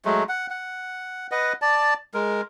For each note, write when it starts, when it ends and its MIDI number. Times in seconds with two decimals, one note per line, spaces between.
0.05 0.23 54
0.05 0.23 56
0.05 0.23 57
0.29 0.47 78
0.50 1.27 78
1.31 1.53 71
1.31 1.53 75
1.31 1.53 78
1.62 1.94 74
1.62 1.94 81
2.14 2.41 56
2.14 2.41 70